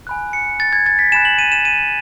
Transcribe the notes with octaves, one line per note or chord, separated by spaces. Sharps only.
G#5 B5 F#6
C#7
A6
G#6
A6
B6
G#5 B5 F#6 E7
F#7
D#7
E7
D#7